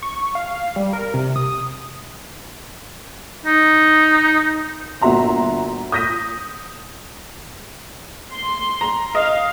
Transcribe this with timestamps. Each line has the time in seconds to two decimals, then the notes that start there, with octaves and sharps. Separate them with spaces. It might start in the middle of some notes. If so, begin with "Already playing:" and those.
0.02 C#6
0.35 F5
0.76 G3
0.93 A#4
1.14 C3
1.36 D#6
3.46 D#4
5.02 G1 A#2 F#4 E5 A#5 C6
5.92 D#6 G6 A#6 B6 D#7
8.33 C6
8.81 A#5
9.15 D#5 F5